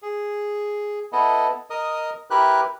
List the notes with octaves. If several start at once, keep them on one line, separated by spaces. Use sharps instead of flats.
G#4
B3 E4 A4 D#5
A#4 D#5 D#6
E4 G4 A#4 B4 F#6